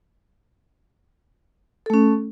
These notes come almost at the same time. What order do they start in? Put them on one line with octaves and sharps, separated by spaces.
A4 A3 C#4